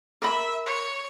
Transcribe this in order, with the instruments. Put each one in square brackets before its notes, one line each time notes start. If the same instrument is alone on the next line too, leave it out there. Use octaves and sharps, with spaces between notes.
[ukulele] A#4 B5 [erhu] E5
[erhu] C#5